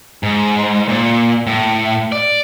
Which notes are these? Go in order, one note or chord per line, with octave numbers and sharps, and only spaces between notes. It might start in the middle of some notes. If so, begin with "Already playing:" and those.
G#2
A#2
A2
D5